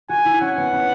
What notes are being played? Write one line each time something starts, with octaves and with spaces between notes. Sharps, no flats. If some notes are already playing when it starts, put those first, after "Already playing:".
F#4 G#5
E4
C#4 F#5
B3
C#4